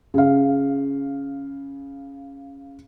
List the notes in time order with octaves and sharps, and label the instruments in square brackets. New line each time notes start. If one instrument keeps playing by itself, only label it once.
[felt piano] C#3 F5